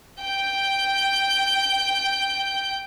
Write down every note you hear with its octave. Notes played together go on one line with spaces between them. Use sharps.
G5 G6